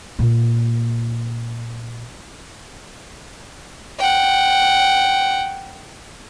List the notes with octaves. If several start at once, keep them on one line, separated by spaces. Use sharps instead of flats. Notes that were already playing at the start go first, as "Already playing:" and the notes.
A#2 A#3
F#5 G5